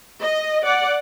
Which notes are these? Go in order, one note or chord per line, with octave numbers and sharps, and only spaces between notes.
D#5
D5 F#5